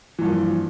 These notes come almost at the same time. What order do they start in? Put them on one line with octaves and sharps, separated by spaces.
E3 G2 F3 A#3